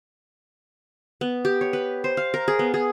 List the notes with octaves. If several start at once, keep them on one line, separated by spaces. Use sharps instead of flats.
B3
G4
C#5
B4
C5
F5
A#4
G#4
B3
G#4